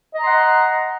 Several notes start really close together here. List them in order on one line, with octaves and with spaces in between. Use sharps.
D#5 A#5 C6 F#5